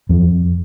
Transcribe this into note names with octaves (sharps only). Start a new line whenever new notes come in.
F2 F3